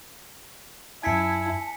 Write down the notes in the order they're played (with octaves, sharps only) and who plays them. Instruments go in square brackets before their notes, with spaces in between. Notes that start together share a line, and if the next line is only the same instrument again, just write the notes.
[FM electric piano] F#2 G#6 [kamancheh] E4 [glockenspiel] G#5 B6 C#7 [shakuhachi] A5